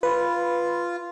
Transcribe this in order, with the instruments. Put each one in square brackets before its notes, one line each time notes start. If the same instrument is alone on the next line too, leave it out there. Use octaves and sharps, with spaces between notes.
[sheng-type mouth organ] F4 [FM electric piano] B4